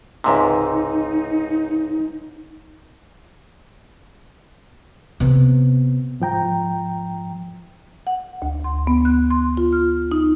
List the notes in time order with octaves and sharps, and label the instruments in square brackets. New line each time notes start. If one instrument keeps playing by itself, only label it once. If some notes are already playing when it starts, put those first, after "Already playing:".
[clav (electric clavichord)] C#2 G#2 C3 [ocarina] D#4
[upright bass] C3 B3
[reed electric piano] G#2 F3 G5 A#5
[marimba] F#5
D2
C6
B3
F#6
C6
F4
F6
D#4